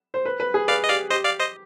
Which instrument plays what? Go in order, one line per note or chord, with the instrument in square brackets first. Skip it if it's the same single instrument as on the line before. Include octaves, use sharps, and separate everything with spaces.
[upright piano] C5
B4
B4
G#4
[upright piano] B4 [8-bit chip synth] D5 F5
[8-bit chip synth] D#5
[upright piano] G4 [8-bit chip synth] D5 F5
[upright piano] G4 [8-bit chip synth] C5 D#5
[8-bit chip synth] D5 F5
C5 D#5